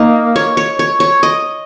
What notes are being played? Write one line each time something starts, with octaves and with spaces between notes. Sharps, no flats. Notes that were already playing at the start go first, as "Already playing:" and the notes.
Already playing: A#3 D#4
C#5
C#5
C#5
C#5
D#5